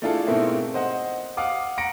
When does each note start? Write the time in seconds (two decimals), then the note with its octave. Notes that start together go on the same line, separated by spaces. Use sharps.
0.02 A3 D4 E4 F4 G#4 A4
0.27 G#2 B2 A3 A#3 C4 E4
0.74 C5 D#5 F#5
1.37 F5 F#5 D6 D#6
1.78 F#5 A#5 A#6 C#7 D7